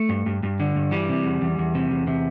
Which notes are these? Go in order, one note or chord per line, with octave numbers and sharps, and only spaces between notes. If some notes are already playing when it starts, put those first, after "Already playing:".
Already playing: A3
G2
G2
G2
D3
G2
E3 G3
C3
E2
E2
E2
C3
E2
C3